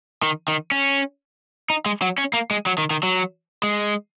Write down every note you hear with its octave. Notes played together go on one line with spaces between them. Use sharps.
D#3
D#3
C#4
D#4
G#3
F#3
C#4
A#3
G#3
F#3
D#3
D#3
F#3
G#3